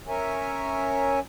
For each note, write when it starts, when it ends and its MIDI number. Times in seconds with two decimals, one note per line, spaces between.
0.08 1.19 61
0.08 1.19 70
0.08 1.19 73
0.08 1.19 76
0.08 1.19 80